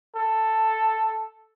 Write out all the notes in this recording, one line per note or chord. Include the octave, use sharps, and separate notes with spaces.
A4